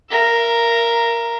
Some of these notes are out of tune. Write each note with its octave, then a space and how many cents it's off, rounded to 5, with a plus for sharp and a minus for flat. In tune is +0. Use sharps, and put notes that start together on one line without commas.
A#4 +0 E5 +45